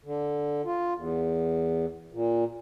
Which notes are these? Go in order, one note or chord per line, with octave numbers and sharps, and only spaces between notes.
D3
F4
E2
A#2